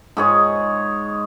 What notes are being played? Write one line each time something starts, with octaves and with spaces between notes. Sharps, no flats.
G#2 G#4 C#5